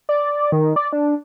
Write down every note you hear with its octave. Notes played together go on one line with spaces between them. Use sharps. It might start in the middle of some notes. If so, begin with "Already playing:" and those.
D5
D#3
D5
D4